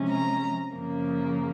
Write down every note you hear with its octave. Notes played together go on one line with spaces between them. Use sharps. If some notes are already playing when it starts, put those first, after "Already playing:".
Already playing: C3 F3 G#3 C#4
A#5
F#2 C#3 F3 A#3